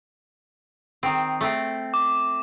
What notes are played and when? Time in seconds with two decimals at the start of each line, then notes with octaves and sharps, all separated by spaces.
1.03 D#3 C4
1.41 A3 C4
1.94 D6